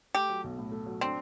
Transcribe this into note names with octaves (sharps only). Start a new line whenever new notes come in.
A3 G4
F#3
B1
A2
A3
F#3
C4 D4